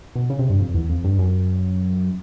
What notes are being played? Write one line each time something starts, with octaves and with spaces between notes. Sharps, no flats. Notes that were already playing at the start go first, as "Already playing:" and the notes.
B2
C#3
C3
G2
F2
E2
F2
G2
F#2